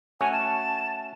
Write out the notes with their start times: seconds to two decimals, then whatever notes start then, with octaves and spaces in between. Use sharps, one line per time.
0.21 A3 C#4 F#4 G#5
0.32 A5